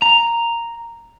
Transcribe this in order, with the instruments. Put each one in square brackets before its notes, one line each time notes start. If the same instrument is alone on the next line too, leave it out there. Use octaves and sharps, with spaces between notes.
[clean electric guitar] A#5